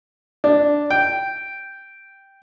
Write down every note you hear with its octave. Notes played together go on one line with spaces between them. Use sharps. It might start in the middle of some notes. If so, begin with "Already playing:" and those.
D4
G5